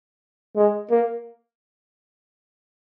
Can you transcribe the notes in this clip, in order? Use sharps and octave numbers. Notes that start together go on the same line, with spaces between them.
G#3
A#3